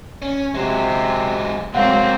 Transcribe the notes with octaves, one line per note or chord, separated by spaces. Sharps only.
C#4
C3 F#3 G#3
C3 F#3 G#3 A#3 C4 F5 F#5